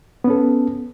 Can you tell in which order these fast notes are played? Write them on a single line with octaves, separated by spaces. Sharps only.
B3 C#4 A4